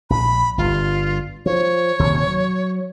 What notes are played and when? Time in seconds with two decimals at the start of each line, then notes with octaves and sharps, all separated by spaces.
0.10 A#1 B5
0.58 G1 G2 F4
1.46 F3 C#5
1.99 D#1 D#2 C3
2.27 F#3